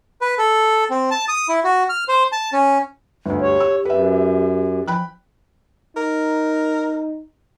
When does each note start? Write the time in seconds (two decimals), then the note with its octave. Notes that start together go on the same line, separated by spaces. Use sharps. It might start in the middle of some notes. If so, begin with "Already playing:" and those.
0.21 B4
0.38 A4
0.90 C4
1.11 A5
1.28 D#6
1.49 E4
1.64 F#4
1.89 F6
2.08 C5
2.32 A5
2.53 C#4
3.26 G1 D2
3.41 G4 C#5
3.60 E6
3.85 F#2 B4 E5
4.88 F3 G5 B5 F#6
5.97 D#4 A#4